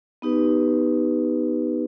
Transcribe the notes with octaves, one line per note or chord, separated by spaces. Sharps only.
B3 D#4 G4 B4